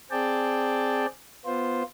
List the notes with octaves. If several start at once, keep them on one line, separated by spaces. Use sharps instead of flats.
C4 G#4 D5 G5 A5
B3 F4 C5